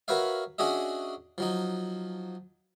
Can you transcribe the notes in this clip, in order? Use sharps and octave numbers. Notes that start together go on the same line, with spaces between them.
F#4 A#4 B4 C#5 E5 F5
C#4 D4 F#4 G#4 D#5 E5
F3 F#3 D#4